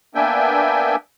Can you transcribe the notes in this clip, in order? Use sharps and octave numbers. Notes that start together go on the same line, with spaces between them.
A#3 B3 D4 E5 G5 G#5